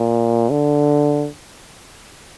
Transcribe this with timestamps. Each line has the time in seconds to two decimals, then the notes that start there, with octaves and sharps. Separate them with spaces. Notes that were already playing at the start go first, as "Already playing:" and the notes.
Already playing: A#2
0.51 D3